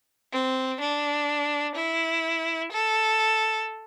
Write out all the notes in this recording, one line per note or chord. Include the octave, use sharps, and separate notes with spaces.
C4
D4
E4
A4